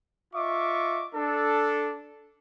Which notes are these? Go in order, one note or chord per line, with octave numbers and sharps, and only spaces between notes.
F4 D#5 E5 C#6 D6
D4 A4